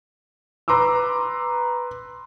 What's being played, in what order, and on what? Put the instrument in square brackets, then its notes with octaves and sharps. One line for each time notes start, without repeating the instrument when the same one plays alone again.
[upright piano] B4 A#5 C6 D6 E6